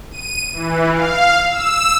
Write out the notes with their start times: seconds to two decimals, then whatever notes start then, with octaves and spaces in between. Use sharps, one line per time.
0.11 D#7
0.53 E3
0.92 F5
1.49 E6